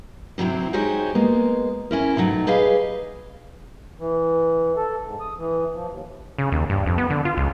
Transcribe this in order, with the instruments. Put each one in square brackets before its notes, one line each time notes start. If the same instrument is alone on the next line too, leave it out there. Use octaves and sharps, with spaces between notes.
[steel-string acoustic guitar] D2 C3 F#3 C4 E4
G#3 D#4 F#4 G4 C5 C#5
G#3 A#3 B3
C#4 E4 A#4
B2 D3 D#3 F#3 A3
G4 G#4 B4 D#5 F5
[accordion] E3
A4
G#2
D#6
E3
F3
D#2
[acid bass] C#3
D#2
G2
F2
B3
D3
F4
C#2